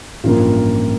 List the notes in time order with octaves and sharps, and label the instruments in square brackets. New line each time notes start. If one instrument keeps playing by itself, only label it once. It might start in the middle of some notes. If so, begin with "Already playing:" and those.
[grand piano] A1 G2 F3 A#3 F4